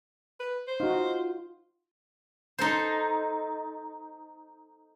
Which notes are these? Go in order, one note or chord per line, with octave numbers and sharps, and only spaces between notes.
B4
C5
D#4 F4 F#4
D#4 A4 C5